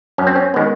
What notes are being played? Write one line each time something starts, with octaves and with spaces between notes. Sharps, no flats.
F#2 C#4
C4
C#4
D#3 G#3 B3